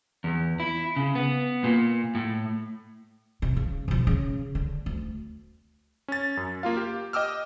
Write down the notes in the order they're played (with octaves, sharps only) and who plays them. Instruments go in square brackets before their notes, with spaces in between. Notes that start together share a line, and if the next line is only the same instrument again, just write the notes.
[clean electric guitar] E2
E4
C#3
B3
A#2
A2
[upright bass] C3
C#3
B1 F3
C#3
D3
D2
[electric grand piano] C#4 A6
F#2
A#3 F4 F5
G4
D#5 G5 D6 E6 F6